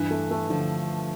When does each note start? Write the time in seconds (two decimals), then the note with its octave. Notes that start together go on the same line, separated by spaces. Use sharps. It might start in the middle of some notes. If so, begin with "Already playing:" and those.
Already playing: G2 E3
0.11 A3
0.31 A3
0.50 D3 F3